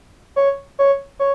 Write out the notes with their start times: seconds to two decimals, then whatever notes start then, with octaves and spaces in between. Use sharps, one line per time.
0.36 C#5
0.79 C#5
1.20 C#5